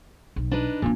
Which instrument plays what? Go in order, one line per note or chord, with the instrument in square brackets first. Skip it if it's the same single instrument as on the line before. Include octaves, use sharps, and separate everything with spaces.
[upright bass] B1
[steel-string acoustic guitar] D4 D#4 B4
[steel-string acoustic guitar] A#2 [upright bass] F3 D4